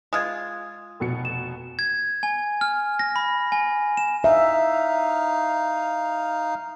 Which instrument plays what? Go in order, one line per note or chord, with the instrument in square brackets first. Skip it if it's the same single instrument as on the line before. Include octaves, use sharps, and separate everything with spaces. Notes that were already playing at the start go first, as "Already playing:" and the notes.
[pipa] G#3 F4 [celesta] D#6 G#6
[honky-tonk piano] F1 B2 C#7
[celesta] E7
[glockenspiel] G#6
G#5
F6
A#6
B5
G#5
E7
[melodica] D#4 F5 [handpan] E5